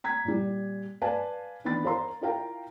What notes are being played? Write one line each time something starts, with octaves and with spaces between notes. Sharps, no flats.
A#5 G#6 B6
A#2 G3
B4 D5 F5 G#5 A5
D#3 E3 B3 D4 B5 A6
A#4 C5 F5 A#5 C6
E4 F4 A#4 F5 G5 A#5